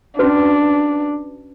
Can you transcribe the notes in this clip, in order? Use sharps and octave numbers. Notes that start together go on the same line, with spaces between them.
C#4 D4 F#4 B4